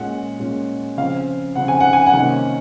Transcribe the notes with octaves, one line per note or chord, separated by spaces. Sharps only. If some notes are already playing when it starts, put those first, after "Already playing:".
Already playing: A#2 G#3 C#4 F#5
A#2 G#3 C#4
C#3 F3 C4 F5
C#3 F3 C4 F#5
G#5
F#5
G#5
F#5
C3 D#3 A#3 C#4